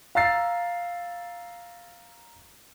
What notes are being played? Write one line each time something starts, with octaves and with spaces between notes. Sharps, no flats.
F5 A#5 E6 A6 C7